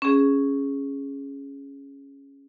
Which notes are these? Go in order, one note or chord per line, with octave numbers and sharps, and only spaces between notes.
C#4 G#4